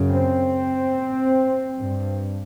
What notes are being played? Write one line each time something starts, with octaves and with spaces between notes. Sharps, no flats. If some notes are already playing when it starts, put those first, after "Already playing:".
Already playing: F#2 C#3
C4
G2